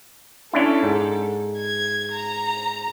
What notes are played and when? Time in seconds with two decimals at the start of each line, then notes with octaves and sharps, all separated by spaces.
0.53 C#4 D4 E4 A4
0.83 G#2
1.58 G#6
2.11 A#5